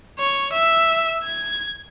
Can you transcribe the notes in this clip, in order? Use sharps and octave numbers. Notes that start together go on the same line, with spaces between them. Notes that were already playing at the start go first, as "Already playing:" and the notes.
C#5
E5
G#6